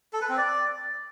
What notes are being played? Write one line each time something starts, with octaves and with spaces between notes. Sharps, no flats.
A4
B4
C4
D5